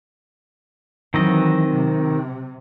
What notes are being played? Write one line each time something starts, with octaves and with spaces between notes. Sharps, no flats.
D#3 E3 F#3 C4 D#5
C3